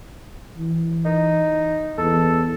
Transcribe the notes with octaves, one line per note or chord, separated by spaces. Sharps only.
E3
D#4
E2 A4